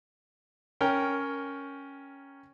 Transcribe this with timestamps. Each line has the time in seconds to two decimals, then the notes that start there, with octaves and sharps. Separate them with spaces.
0.81 C#4 A#4 G5